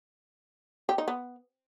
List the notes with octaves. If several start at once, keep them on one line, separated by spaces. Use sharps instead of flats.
G4
D#4
B3